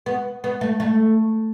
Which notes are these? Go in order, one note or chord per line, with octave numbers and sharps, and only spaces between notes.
B3
B3
A3
A3